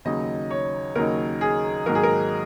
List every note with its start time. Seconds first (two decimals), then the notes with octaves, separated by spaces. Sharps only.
0.05 D#2 C#3 F#3 D#4 D#5
0.51 C#5
0.96 D#2 C#3 F#3 D#4 A#4
1.41 G#4
1.86 G#2 D#3 F#3 A#3 D#4 A#4
1.95 G#4
2.03 A#4